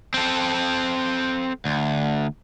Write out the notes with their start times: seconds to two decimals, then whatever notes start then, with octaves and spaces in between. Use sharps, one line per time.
0.14 C4 A4
1.65 D2